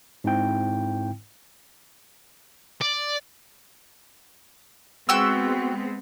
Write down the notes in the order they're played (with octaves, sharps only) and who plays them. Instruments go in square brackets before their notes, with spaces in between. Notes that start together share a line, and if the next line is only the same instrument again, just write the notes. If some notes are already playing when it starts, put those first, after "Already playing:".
[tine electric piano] G#2 C4 E4 G5
[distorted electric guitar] D5
[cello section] G#3 B3 C4 [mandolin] F#4 G5 E6